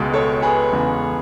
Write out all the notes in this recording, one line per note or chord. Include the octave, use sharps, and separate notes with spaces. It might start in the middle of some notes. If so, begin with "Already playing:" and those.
Already playing: C#2 B2 G#3
A4 C#5
G#4 B4
E2 C#3 G#3